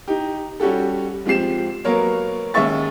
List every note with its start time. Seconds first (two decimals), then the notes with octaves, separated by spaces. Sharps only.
0.08 D#4 G4
0.60 G3 C#4 F#4 G4 A4
1.26 G#2 F3 C4 G4 C7 E7
1.85 F#3 A#3 B3 A#4 C#5
2.54 D#2 G#3 C#4 E5 C#6 A6